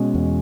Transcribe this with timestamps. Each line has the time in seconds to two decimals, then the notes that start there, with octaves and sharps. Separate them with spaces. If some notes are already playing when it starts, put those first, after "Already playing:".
Already playing: B2 G#3 C#4
0.14 E2